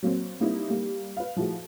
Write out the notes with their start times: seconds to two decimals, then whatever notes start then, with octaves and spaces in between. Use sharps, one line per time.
0.03 F#3 A#3 C4
0.40 G3 A#3 C4 D#4 E4
0.68 G3 A#3
1.16 B4 F5
1.36 F3 A3 E4 F#4 G#4